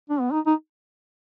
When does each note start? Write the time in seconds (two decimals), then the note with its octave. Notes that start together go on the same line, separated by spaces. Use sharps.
0.10 D4
0.20 B3
0.32 D#4
0.46 D#4